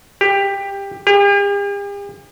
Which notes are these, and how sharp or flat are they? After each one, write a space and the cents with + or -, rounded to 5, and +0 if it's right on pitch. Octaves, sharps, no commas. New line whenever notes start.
G4 +15
G4 +45